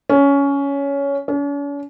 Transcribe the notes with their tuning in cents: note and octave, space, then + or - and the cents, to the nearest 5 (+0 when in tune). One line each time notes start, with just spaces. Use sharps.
C#4 +15
C#4 +45